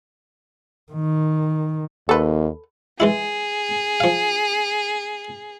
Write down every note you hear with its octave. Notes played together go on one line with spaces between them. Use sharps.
D#3
D#2 A4 B4
E3 G#3 E4 G#4
F3 F5